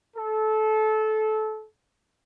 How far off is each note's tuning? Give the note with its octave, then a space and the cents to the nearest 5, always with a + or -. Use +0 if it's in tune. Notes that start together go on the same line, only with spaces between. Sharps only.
A4 -20